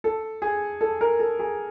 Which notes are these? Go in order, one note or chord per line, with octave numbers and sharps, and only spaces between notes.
A4
G#4
A4
A#4
A4
G#4